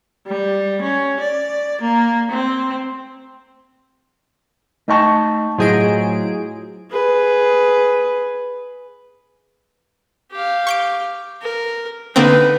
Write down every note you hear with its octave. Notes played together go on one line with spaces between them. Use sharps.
G3
C#4
D5
A#3
C4
A3 D#4 D#5 G5 A5 C#6
A2 F#3 F4 G#4 C5 D#5 D7
G#4 B4
G4 F5
C#6 G6 D7
A#4
D3 A#3 C4 D#4 B4